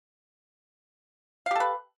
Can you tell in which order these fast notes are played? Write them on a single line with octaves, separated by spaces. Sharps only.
F5 G4 A4 B4